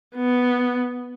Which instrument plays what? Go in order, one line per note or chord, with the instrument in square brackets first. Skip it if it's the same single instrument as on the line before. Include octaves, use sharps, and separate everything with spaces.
[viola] B3